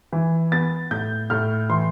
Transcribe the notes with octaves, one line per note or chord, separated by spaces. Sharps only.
E3
B3 A6
A2 G6
A2 F6
E3 C6